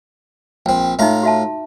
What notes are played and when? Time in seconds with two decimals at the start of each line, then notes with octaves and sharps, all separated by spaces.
0.66 A#1 C4 G5
0.99 A2 D#4 F4 E5 A#5
1.23 F#4 E5 A5